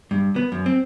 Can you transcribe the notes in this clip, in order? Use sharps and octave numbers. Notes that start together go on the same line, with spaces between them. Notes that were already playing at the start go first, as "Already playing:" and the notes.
G2
B3
F#2
C4